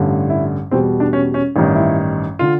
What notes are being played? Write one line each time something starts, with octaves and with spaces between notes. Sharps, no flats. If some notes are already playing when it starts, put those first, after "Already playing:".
Already playing: A1 G2 D3
E4
E2 B2 G3 C4
D4
C#4
C#4
A1 G2 D#3
E4
D3 F4